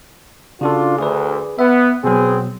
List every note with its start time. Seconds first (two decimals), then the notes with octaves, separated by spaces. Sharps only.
0.61 C#3 D4 F4 F#4 A4
0.99 D2 G#4 B4
1.59 B3 E5
2.04 B2 F#3 B3 C4 G#4